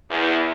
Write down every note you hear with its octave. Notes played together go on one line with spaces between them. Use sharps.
E2